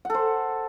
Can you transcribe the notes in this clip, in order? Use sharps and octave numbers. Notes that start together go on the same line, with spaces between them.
A4 C5 F#5